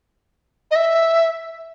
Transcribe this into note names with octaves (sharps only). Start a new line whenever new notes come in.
D#5
E5